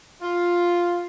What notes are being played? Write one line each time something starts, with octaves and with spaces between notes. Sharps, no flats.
F4